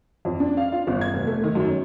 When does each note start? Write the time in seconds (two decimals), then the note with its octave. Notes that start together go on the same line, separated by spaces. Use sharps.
0.25 F2
0.40 D4
0.57 F5
0.72 F4
0.87 G1
1.01 G#6
1.14 F1
1.27 A3
1.44 D#3
1.55 F#2
1.68 C#4